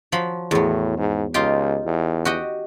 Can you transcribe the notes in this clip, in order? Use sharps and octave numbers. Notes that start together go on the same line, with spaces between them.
F3 F#3 B5
E2 A2 F#3
G#2
C#2 D#4 F4 G4
E2
F#4 G4 D#5